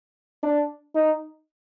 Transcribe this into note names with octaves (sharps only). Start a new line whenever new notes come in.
D4
D#4